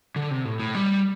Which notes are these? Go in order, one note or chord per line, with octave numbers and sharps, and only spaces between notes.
D3
C3
A2
A2
G3